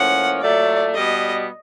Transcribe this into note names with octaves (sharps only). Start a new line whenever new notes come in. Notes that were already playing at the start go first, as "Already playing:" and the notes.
Already playing: A2 F3 A#3 C#4 F#5
A#2 F#3 A3 D5
B2 G3 B3 D#5